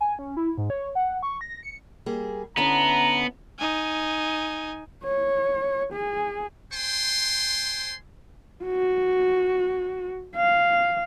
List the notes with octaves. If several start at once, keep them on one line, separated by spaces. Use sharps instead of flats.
G#5
C#4
E4
G#2
C#5
F#5
C#6
A#6
C#7
G3 A#3 G#4
D3 B3 C#4 E4 A#5
D#4 G#5
C#5
G#4
C5 G5 G#5 C6
F#4
F5